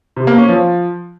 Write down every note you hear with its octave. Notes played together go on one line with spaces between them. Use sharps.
C3
A#3
C#4
F3